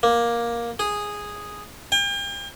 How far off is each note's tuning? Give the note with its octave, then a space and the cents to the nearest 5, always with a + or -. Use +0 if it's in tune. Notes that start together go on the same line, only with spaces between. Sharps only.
A#3 +10
G#4 -5
G5 +40